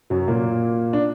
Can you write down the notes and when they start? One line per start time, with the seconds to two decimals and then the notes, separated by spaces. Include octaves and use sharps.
0.10 F#2 F#3
0.28 A#2 A#3
0.93 D4